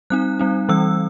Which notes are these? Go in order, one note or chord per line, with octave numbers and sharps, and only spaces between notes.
G3 C4 D#4 F#6
G3 C4 D#4
E3 G3 C4 E6